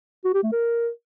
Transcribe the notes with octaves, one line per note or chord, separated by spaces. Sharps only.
F#4
G4
A3
A#4